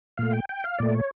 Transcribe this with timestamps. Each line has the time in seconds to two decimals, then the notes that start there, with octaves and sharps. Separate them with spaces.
0.18 A#2 A3 F5
0.33 G5
0.49 G5
0.64 F5
0.79 A#2 A3 D5
0.95 C#5